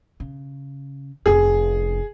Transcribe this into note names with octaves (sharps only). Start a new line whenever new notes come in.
C#3
F1 C#4 G#4